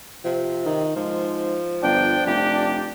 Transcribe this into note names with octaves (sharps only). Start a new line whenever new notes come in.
C3 F3
D#3
G#2 F3
G1 D4 G5
F1 G4